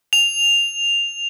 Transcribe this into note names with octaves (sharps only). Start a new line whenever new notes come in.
F7